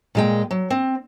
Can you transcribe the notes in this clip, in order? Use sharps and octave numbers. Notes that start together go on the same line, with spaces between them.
A#2 G#3 G5
F#3
C4